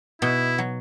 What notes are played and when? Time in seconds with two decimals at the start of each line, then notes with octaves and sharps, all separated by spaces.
0.22 B2 E4
0.58 F#3